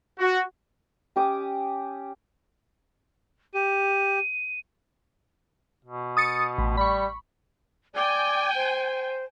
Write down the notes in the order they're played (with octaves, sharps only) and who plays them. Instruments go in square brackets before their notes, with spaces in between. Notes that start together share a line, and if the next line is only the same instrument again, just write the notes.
[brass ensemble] F#4
[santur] C#4 G4 D6 D#6
[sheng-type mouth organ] G4 [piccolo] D#7
[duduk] B2
[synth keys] D#6 A6 C#7
A1
[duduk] G3 [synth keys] B5 C#6
[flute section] D5 D6 [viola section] G5 G#5
[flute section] C5